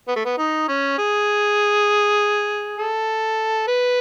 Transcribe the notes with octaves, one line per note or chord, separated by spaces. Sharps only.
B3
A3
B3
D#4
C#4
G#4
A4
B4